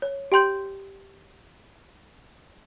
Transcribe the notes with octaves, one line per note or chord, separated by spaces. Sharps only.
C#5
G4 G5 C6 G6 F#7